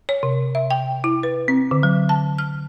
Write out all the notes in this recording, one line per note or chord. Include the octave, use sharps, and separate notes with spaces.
C#5
C3
E5
G5
E4
B4
C4
D3
F#3
A5
F6